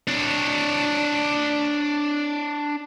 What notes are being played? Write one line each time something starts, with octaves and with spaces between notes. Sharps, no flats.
D4 C#5